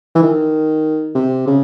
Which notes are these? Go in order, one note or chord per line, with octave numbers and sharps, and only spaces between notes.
E3
D#3
C3
C#3